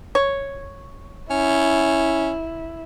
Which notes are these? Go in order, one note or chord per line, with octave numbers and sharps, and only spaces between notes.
C#5
C#4 E4